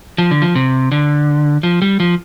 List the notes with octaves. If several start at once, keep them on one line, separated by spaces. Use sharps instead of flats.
F3
D3
F3
C3
D3
F3
G3
F3